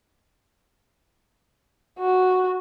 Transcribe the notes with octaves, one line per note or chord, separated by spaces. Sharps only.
F#4